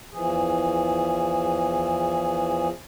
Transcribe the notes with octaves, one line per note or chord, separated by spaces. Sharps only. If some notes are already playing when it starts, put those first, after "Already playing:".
E2 E3 F3 G#4